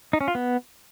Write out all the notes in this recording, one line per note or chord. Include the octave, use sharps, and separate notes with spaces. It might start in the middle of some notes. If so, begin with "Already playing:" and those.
D#4
C#4
F4
B3